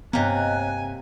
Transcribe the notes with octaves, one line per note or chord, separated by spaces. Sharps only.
G2 C3 A#3 B3 C#5 D#5 G#5 F#6